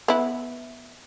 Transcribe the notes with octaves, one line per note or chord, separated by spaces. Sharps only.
B3 E4